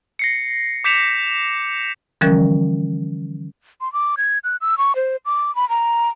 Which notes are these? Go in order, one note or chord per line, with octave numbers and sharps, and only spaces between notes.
A#6 C7 C#7
D6 G6 B6 C#7 E7 F7
D3 E3 F3 G3 C#4 A#4
C6
D6
G#6
F#6
E6
C#6
C5
D6
B5
A#5